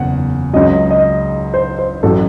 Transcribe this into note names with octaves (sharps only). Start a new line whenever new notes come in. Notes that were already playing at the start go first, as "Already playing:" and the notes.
Already playing: F#1 E2 F#5
C#2 C#3 F#3 D#5
D#5
C5
C5
A1 F#3 A4